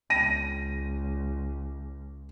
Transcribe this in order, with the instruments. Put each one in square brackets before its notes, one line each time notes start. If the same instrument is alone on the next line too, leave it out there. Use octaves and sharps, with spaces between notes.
[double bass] C#2 [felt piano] A#6 D#7